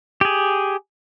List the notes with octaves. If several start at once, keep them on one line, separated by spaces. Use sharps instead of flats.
G4 G#4